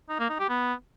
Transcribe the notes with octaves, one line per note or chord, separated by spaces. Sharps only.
D#4
A#3
D#4
G4
B3